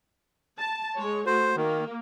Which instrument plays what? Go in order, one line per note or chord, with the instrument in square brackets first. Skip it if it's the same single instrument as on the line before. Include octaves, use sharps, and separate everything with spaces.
[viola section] A5
G#3 C#5
[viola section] A3 F#4 [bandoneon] C5
[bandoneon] D#3 [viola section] A#3